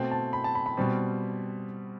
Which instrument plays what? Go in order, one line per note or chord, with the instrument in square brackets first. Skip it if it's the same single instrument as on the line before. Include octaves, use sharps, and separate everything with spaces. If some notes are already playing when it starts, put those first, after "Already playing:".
Already playing: [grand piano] B2 A3 C4
A5
B5
A5
B5
B5
B2 G3 C4